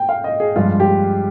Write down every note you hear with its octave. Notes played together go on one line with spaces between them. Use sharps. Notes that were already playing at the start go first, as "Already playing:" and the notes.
Already playing: G5
F5
D#5
G#4
G2 F3 G#3 F4
G4